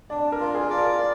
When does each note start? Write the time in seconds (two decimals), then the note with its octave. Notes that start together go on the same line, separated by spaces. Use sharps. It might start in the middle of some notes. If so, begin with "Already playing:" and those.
0.10 D4 D5
0.32 A#4
0.40 F4
0.55 G#4
0.70 D5
0.78 A#4